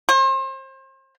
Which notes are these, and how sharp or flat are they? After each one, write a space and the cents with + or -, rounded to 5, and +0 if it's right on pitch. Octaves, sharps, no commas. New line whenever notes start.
C5 +35